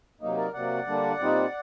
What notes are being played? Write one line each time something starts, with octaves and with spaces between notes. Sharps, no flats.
C3 F#3 A#3 D#4
A#4 D5
C3 F#3 A#3 D5 F#5
D3 G3 A#3 D4
A#2 G3 C4 D#4